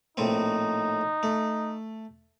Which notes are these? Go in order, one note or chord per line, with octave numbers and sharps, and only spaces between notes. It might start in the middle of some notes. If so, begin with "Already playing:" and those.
A#1 A2 C4 D#4
A3